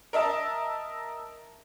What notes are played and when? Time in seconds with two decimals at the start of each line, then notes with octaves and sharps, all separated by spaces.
0.13 A#4 D#5 E5 A5